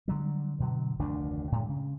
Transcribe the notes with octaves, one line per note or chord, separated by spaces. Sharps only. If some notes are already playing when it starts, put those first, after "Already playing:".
D3 F#3 G3
G2 B2 D3 F#3
F1 D2 D#3 D4
A2 G#3
C#3